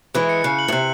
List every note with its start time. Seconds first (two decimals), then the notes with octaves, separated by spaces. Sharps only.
0.14 E3 G#3 F#6
0.29 C#7
0.44 C#3 F#6
0.59 F#7
0.68 A2
0.72 C3 F#6